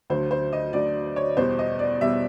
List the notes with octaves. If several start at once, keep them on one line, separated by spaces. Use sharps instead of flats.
D2 D3 F#3 C5
C5
D#5
D2 D3 F#3 D5
C#5
E2 B2 G3 C5
D#5
D5
E2 B2 G3 E5